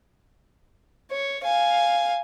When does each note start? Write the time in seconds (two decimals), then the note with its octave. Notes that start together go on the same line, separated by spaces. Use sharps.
1.11 C#5
1.43 F5 G#5